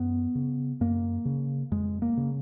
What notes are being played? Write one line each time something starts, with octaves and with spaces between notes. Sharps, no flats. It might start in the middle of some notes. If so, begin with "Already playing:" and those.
Already playing: F#2 B3
C#3
F#2 A#3
C#3
F2 G#3
A#3
C#3